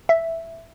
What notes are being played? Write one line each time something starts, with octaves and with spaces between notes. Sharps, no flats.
E5